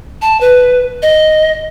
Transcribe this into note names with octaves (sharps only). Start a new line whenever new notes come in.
A5
B4
D#5